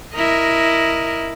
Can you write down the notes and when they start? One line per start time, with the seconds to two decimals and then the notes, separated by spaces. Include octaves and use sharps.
0.15 E4 A#4 D#5